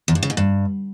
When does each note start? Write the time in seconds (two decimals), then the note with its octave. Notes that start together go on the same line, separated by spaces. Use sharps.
0.08 E2
0.15 G2
0.23 C#3
0.30 G#2
0.37 G2